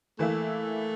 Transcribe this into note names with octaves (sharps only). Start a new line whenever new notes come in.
E3 A3 A#3 E4